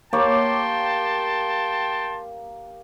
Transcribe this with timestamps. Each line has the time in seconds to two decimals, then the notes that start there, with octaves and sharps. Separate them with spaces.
0.13 A#3 G4 C#5 G5 A5 C6